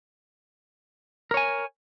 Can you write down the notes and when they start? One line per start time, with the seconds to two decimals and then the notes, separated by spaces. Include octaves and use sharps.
1.31 A#4
1.34 C#5
1.37 G#5